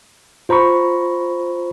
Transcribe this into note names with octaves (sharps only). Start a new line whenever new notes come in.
F4 C5 A#5 B5 C#6